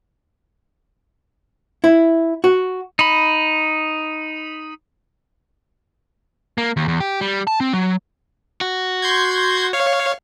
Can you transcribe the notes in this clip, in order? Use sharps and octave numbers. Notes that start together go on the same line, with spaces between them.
E4
F#4
D#4 B5
A#3
D#2
E2
G4
G3
A5
C4
F#3
F#4
C6 G6 G#6
C#5 F5